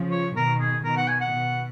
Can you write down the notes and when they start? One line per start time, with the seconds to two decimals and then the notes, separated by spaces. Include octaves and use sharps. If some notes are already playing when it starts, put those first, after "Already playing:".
Already playing: C#3 F3
0.11 C#5
0.35 B2 D#3 A#4
0.60 G#4
0.84 B2 D#3 A#4
0.97 F#5
1.08 G#5
1.20 F#5
1.32 B2